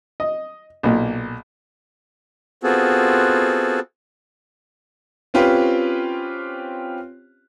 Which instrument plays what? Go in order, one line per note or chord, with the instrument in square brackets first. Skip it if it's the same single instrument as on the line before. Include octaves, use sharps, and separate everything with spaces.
[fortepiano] D#5
B1 A#2
[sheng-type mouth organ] B3 C4 F4 F#4 G#4 A4
[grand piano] C4 C#4 F4 G4 B4